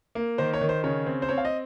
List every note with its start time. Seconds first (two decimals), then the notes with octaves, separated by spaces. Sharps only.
0.15 A#3
0.38 D#3 C5
0.54 C#5
0.61 D#3
0.69 C5
0.84 C#3 C#5
1.06 C4
1.22 C5
1.29 C4 C#5
1.38 F5
1.45 D#5